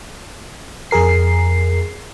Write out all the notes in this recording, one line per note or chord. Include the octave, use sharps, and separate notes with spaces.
F2 G#4 A#4 C7